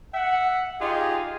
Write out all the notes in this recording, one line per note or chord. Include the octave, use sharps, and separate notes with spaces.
E5 F#5
D#4 F4 G4 G#4 D#5